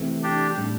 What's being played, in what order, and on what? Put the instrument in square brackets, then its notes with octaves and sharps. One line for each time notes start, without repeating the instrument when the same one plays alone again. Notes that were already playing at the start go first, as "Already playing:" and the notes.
Already playing: [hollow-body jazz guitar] C3 E3 A3 C4
[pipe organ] D4 G4
[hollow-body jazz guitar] A2 G3 D4